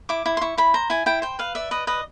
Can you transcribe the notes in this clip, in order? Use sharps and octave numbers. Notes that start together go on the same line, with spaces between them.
E4 D6
E4
C6
E4 C#6
E4 B5
C5 A#5
E4 G#5
E4 G5
C5 G5
B4 F5
D5 E5
B4 D#5
B4 D#5